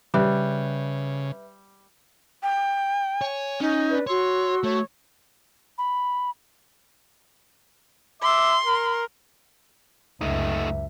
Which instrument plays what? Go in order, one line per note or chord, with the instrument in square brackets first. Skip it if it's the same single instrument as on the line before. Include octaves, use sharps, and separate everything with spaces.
[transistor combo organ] C#3 [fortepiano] G3 [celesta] B4 E5 F#6
[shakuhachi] G5
[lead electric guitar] C#5 [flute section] G#5
[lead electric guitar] C#4 [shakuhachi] D#4
[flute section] B4 D5
[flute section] F#4 E6 [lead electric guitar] C#5 [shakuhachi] C6
[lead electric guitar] A3 [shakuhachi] C#5
[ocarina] B5
[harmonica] E5 D6 [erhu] C6
[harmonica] A#4
[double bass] C#2 F#2 [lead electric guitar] A3 D#4 [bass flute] E5